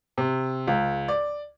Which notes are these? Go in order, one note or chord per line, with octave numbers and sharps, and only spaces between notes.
C3
C#2
D5